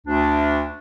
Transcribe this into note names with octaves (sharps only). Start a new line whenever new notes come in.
D2 D4